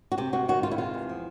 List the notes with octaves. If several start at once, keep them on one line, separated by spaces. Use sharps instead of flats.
F#4
C3 G4
C3 F#4
D#3 F#4
G#3 F4
E4
C3 F4
E2
F3